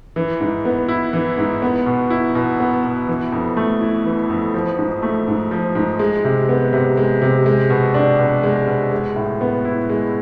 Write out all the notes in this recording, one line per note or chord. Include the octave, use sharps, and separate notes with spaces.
E3
G#2
B3
E4
E3
G#2
B3
B2
E4
B2
B3
B2
E3
F2
A3
E4
E3
F2
F3
G#2
A3
G#2
F3
G#2
G#3
C3
B3
C3
G#3
C3
G#3
B2
D4
B2
G#3
B2
G#3
A2
B3
E4
G#3